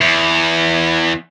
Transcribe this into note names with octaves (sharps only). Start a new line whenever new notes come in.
E2